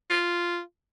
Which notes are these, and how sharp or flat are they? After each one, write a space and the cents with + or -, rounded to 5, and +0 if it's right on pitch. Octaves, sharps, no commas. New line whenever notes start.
F4 -5